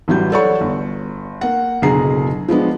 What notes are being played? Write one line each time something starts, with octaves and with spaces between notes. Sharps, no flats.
A1 E3 F#3 G3 G6
A4 C#5 D5 F#5 C#6
G1
A#3 F#5
F#1 B2 D3 G#4 A#5 C7
F3 G#3 B3 D4